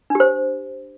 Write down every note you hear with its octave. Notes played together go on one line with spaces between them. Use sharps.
D4 G4 C5